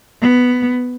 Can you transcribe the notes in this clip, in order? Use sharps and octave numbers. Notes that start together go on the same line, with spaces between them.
B3